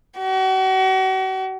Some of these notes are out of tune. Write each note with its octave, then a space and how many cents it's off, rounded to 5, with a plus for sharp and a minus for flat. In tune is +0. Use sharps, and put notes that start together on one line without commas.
F#4 +40